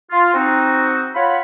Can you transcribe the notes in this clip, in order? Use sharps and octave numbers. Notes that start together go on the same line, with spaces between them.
F4
C4 D#4 F#4
F4 C#5 F#5 B5